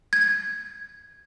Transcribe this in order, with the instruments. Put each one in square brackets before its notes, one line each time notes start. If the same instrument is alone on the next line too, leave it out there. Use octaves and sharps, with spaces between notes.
[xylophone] G#6